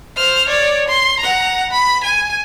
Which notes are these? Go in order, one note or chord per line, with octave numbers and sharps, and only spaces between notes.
C5 F6
C#5 D5
C6
F#5 A#5
B5
G#5